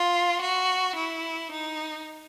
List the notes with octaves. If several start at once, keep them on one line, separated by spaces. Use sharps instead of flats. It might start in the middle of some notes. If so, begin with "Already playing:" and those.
Already playing: F4
F#4
E4
D#4